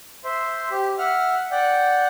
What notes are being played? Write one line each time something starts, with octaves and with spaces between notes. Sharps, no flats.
C5 E5 C6
G4
E5 F#5 F6
D5 F#5 G5